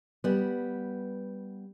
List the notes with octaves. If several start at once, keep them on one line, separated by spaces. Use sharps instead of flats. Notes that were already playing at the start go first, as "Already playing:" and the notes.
G3 B3